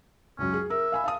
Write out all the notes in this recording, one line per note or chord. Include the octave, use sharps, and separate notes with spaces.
C#2 F#2 C#4
G#4
A#4 E5
F5 G#5 B5
F5 A5 D#6